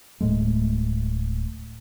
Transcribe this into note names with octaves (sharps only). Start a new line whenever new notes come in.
D1 A2 G#3 A3